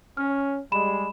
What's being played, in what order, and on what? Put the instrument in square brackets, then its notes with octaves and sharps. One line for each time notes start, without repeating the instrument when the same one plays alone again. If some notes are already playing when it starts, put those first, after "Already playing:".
[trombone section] C#4 [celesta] F6
[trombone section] G3 G#3 [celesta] B5 E7